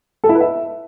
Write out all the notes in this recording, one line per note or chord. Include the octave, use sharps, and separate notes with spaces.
A4
E4
B4
E5